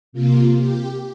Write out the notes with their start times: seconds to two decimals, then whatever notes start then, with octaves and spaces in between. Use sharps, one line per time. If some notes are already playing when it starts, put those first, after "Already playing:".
0.13 C3 A#3 F4
0.57 G4